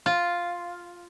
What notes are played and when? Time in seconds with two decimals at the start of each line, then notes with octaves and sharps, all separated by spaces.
0.06 F4